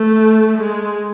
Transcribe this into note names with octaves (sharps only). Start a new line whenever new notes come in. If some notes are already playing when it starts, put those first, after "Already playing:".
Already playing: A3
G#3